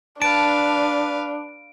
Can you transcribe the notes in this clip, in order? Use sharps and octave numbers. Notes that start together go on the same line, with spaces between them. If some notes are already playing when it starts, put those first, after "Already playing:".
D4 B4 F5 A5 D7